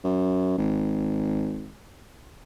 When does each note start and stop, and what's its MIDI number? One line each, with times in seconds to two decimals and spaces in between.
0.04 0.53 42
0.58 1.72 32